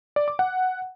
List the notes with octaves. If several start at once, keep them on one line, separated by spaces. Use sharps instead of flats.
D5
D6
F#5